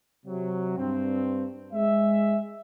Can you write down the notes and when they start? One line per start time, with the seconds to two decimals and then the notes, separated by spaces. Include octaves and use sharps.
0.26 C3 F#3
0.78 G2 C4
1.73 G#3 E5